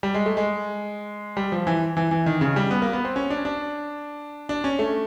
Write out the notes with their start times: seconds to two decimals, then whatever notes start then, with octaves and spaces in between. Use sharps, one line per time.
0.03 G3
0.14 G#3
0.26 A3
0.37 G#3
1.37 G3
1.52 F3
1.67 E3
1.97 E3
2.11 E3
2.26 D#3
2.41 C#3
2.56 G3
2.71 B3
2.82 A#3
2.93 B3
3.05 C4
3.16 C#4
3.30 D4
3.45 D4
4.49 D4
4.64 C#4
4.79 A3